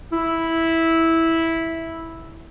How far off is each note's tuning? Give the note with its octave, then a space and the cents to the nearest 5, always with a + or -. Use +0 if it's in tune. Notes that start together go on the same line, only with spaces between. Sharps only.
E4 -10